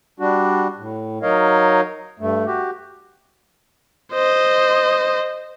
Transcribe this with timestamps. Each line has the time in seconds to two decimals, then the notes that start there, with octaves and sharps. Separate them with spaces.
0.20 G3 D4 F#4
0.78 A2
1.22 F#3 D#4 A#4 C#5 D#5 F5
2.20 G2 A3
2.46 F#4 G4
4.13 C5 D#5